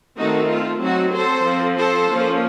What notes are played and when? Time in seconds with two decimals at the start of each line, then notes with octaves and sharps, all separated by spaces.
0.17 D#3 A3 C4 D#4 F#4
0.49 F4
0.82 F#3 C4 D#4 F#4
1.14 A4 C5
1.45 F3 C4
1.78 A4 C5
2.10 F3 A#3 C#4